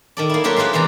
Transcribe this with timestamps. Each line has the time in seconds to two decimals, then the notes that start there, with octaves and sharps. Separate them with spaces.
0.17 D#3 A4 D5
0.30 A#3 E4
0.44 F#3 A#3 F4 G4 A4 B4
0.56 G#3 F4 G4 B4 E5
0.73 C3 E3 B3 D5 A#5